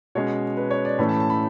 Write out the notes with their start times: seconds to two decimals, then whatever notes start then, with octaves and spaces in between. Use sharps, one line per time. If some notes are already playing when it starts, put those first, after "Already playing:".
0.15 B2 G#3 C#4 C#5
0.57 B4
0.71 C#5
0.85 D5
0.99 A2 E3 A3 C#4 B5
1.09 A5
1.20 A5
1.30 B5